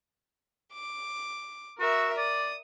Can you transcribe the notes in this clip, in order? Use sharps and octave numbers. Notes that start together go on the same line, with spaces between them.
D6
F#4 A#4 E5 E6
D5 D#6